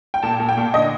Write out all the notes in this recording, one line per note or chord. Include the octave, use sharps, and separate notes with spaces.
G5
A#2 A5
A#2
G5
A#2
D3 D#5